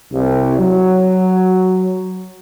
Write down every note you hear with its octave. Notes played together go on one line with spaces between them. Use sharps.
C2
F#3